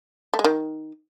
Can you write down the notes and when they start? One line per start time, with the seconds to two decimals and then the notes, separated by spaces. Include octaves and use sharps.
0.34 A3
0.39 G#3
0.44 D#3